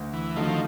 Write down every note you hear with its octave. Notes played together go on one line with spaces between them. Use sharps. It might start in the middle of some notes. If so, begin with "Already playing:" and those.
Already playing: D2
E3
D3 D#3 F3 F#3 A3